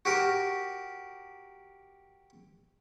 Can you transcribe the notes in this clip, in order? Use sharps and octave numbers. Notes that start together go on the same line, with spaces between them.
F#4 G4 A#4